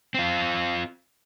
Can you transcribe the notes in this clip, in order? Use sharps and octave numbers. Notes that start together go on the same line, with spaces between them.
C4 F4